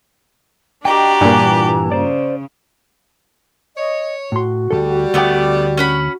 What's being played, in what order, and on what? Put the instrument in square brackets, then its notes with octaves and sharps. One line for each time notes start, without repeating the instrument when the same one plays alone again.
[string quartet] D4 F#4 G4 [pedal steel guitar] D#5 G5 [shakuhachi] A#5
[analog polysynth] G2 A#2 [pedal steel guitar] E3 G#5 F#6
[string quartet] C#3 [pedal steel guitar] C5 D5
[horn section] C#5 [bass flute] D#5
[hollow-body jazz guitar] A2 C6 [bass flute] F#4
[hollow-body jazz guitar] D2 C3 A4 [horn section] G3
[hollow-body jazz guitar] D2 G5 [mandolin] A3 B3 D5
[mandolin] C#4 F#5 B5